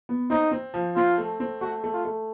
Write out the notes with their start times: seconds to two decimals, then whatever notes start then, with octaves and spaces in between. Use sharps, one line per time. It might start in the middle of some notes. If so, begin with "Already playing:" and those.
0.09 B3
0.30 C4 D#4
0.52 C4
0.74 F3
0.96 C4 F4
1.18 A3
1.40 C4
1.61 A3 F#4
1.84 A3
1.94 F4
2.05 A3